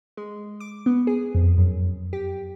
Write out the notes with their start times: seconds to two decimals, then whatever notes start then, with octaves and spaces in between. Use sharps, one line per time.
0.17 G#3
0.60 D6
0.86 B3
1.07 G#4
1.35 F2
1.58 F#2
2.13 G4